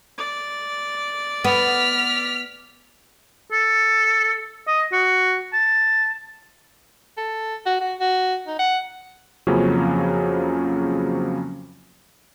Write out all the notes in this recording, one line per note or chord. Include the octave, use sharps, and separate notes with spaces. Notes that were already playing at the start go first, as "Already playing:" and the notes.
D5
B3 F6 B6
A4
D#5
F#4
A5
A4
F#4
F#4
F#4
D#4
F#5
F2 C#3 F3 F#3 A#3 C#4